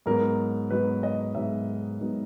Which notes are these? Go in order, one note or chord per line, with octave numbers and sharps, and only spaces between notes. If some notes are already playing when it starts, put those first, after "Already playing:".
G#2 F#3 B3 D#4 A#4
G#2 F#3 B3 D#4 B4
D#5
G#2 F#3 B3 D#4 E5
G#2 F#3 B3 D#4